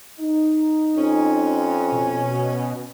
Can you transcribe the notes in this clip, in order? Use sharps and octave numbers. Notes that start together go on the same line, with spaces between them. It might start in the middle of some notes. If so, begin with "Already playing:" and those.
D#4
F2 C#4
B2